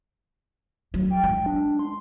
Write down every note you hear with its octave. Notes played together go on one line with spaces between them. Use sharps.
F#3
G5
G#3
D4
C6